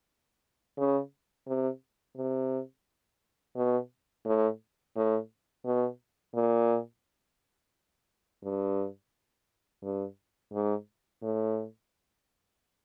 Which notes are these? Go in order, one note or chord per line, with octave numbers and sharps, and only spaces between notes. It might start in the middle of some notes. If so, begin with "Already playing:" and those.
C#3
C3
C3
B2
A2
A2
B2
A#2
G2
G2
G#2
A2